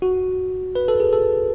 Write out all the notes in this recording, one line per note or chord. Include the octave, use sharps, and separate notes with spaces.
F#4
B4
A4
G#4
A4